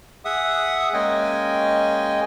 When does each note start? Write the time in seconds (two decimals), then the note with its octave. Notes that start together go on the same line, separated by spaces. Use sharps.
0.25 G#4 E5 F#5 D#6
0.94 G#3 A#3 C#4 D#5 G5 G#5